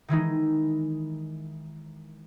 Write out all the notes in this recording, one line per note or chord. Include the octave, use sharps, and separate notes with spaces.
D#3 E3 G#3 D#4